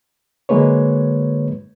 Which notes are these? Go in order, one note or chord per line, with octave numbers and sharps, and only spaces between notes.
D3 F#3 G#3 A#3 B4 C#5